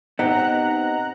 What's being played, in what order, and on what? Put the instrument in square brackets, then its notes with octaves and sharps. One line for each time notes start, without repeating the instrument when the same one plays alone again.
[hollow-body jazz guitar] B3 C4 G4 [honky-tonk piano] D#4 [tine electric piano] F#5 [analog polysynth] A#5 F#6